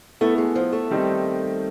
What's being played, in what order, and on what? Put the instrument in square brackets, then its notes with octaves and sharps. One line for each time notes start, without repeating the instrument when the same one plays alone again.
[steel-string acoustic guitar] A3 [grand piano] B3 E4 A4
[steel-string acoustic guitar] G#3
F3
A3
[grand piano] D#3 G3 C4 D#4